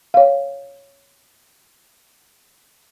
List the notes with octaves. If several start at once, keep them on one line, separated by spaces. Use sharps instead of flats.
C#5 F5